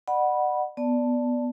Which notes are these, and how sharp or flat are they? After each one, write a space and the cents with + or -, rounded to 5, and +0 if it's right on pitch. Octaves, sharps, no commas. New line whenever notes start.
D5 +40 F#5 +0 B5 -15
B3 +0 D5 +0 A5 +0